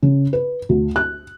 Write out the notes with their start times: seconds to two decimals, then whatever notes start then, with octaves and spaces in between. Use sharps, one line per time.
0.03 C#3
0.33 B4
0.69 D2
0.96 F#6